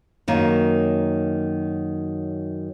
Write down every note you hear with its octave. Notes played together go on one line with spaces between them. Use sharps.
F#2 D#3 A#3